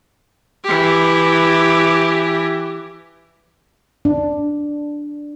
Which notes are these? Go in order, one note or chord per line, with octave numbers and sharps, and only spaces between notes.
E3 G4
D4